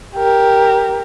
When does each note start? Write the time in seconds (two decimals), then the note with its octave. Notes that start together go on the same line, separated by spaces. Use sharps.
0.15 G4 A#4